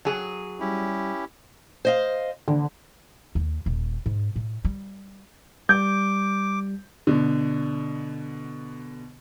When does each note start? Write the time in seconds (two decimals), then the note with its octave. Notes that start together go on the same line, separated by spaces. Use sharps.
0.05 F#3 G#4
0.60 G3 C#4 E4 G4
1.85 C5 D#5 F5
2.48 D2 D3
3.35 D#2
3.66 D#1
4.06 G#2
4.36 A2
4.65 G3
5.69 G3 D6 G6
7.07 B2 D3